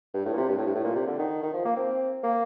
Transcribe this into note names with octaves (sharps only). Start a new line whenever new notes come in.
G2
A2
A#2
C3
G2
A2
G2
A2
A#2
C3
D3
D#3
D#3
F3
A#3
C4
A#3